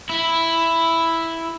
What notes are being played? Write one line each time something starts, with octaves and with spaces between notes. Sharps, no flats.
E4